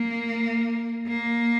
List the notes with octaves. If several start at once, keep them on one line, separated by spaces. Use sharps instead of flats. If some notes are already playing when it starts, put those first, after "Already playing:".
Already playing: A#3
A#3